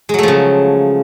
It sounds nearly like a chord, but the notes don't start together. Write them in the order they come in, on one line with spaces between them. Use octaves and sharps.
G#3 F#3 A3 F3 C#3